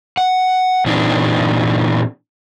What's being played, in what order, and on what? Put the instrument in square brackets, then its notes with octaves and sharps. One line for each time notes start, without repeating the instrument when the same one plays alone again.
[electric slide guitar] F#5
A#2 E3 C4 D4 D#4